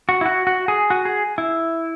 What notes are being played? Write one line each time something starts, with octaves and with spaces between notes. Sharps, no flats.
F#4
E4
F#4
F#4
G#4
F#4
G#4
E4